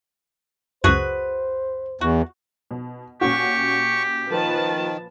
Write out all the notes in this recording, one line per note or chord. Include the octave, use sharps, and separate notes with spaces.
C#2 F#2 F#4 G#4 B4 C5
E2 F#4
B2
A#2 C#4 F#4 G4 C#6
D#3 F3 B4 A5